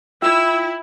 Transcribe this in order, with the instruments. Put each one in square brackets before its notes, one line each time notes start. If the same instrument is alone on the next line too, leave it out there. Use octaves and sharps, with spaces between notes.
[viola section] E4 [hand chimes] F4 E5 G5 [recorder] E6